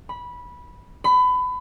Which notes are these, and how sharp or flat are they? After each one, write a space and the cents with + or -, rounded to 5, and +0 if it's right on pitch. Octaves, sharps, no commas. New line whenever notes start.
B5 -15
B5 +25